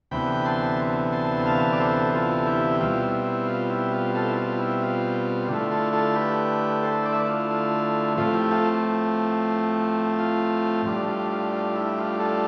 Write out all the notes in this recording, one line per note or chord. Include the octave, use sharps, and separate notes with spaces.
D2 C3 E3 B3 G5 B5
A5 C6
A5 C6
F5 A5
D5
A4 C5
F4 A4
E4 G4
B2 G3 C4 E4 F4
E4
E4
F4
E4
F4
F4 A4
E4
F4
E4
F4
D3 A3 E4 F4
F4 A4
F4 A4
G4 B4
A4 C5
D5
E5
B4 D5
F4
F4
A2 F3 A3 C4 F4
E4 G4
F4 A4
F4
A2 G3 D4 F4
F4
F4
F4
E4
F4
F4 A4